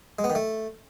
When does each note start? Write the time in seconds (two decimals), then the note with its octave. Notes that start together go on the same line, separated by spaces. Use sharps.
0.19 G#3
0.24 B3
0.30 D#3
0.35 A3